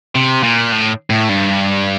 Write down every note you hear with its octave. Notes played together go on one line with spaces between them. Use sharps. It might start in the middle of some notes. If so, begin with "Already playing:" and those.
C3
A#2
A2
A2
G2